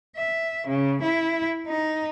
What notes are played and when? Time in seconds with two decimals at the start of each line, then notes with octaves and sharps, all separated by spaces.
0.17 E5
0.67 C#3
1.02 E4
1.67 D#4